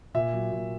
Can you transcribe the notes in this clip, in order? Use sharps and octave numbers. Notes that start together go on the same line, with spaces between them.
A#2 E5
F#3
A#2